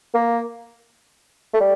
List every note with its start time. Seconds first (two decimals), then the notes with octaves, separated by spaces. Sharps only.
0.14 A#3
1.54 A3
1.60 G3